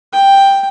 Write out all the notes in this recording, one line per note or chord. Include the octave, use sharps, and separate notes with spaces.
G5